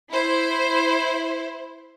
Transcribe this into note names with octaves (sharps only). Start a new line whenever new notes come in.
E4 C5